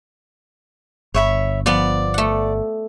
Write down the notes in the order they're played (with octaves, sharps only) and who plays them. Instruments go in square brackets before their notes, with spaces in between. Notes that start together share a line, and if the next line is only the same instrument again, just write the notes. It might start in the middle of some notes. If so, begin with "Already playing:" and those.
[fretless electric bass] G1 [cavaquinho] C#5 E5 B5
[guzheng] F3 B3 [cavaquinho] D5
[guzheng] A3 F#5